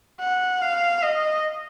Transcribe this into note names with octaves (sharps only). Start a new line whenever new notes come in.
F#5
F5
D#5